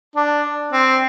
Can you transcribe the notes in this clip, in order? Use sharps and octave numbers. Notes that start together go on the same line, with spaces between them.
D4
C4